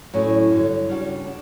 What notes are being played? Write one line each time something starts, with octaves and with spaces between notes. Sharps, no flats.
A2 F#3 C#4
G2 D3 F#3
C#3 G3 D4 F#4
D4